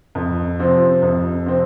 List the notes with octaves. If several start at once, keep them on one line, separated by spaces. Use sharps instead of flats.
F2
C3 F3 C4
F2
C3 F3 C4